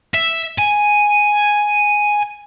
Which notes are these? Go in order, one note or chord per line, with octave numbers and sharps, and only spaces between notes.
E5
G#5